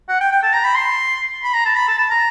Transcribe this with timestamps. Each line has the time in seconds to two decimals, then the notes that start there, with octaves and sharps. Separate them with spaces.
0.09 F#5
0.21 G5
0.32 G5
0.43 A5
0.54 A#5
0.64 B5
0.75 C6
1.43 B5
1.54 A#5
1.65 A5
1.76 B5
1.88 A5
1.98 A5
2.10 A#5